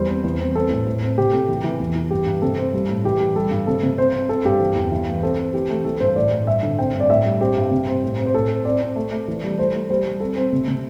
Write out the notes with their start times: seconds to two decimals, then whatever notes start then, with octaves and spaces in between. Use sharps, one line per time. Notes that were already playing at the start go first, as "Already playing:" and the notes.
Already playing: E2 G3 C5
0.08 C4
0.24 E2
0.40 C4
0.55 C4 A4
0.70 A2
0.87 A2
1.02 C4
1.18 C3 G4
1.33 C3 A4
1.48 E3
1.64 E3
1.80 E2
1.96 E3
2.11 G2 G4
2.26 G2
2.42 C3 A4
2.58 C4
2.73 G3
2.88 A2
3.04 E3 G4
3.20 G3
3.36 G3 A4
3.51 G2
3.67 C3 A4
3.83 C3
3.98 C4 C5
4.13 C4
4.29 C4 A4
4.45 G2 G4
4.61 E3
4.76 E2
4.91 E3
5.07 A3
5.22 C4 A4
5.38 C4
5.53 E3 G4
5.70 A3
5.84 E3 A4
6.00 G2 C5
6.16 A2 D5
6.31 A2
6.47 G2 E5
6.63 D3
6.78 C4 G5
6.94 G2
7.00 D5
7.09 A2 E5
7.25 G3
7.40 C4 G4
7.57 G2
7.71 C3
7.87 C4
8.03 A2
8.18 C4
8.26 C5
8.34 A2 A4
8.49 C4
8.65 C4 D5
8.81 C4
8.96 A3
9.12 A3
9.28 E3
9.44 G3
9.58 A3 C5
9.75 A3
9.89 G3 C5
10.06 G3
10.20 C4 A4
10.36 C4
10.53 C3
10.68 C3